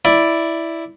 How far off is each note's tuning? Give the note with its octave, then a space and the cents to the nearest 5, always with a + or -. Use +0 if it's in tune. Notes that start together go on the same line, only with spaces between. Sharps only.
E4 +0 D5 +0